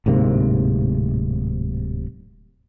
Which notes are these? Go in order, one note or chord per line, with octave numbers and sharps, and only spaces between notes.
D1 G#2 C3 A#3